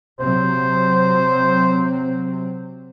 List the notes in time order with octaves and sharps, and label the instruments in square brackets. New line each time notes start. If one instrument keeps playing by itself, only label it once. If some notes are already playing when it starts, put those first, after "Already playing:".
[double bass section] C3 F#3 C4 [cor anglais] C5